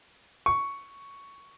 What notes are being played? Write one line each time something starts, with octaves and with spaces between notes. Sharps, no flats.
C#6